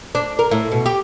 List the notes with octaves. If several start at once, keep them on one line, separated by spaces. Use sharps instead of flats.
D4
A#4
A2
B2
G4